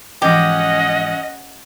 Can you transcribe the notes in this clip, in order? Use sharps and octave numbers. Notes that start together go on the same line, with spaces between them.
G#2 E3 F3 G#3 C#4 G4 D#5 F#5